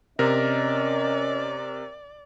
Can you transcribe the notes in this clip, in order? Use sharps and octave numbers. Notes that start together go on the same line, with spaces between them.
C3 C#4 A#4 D5 D#5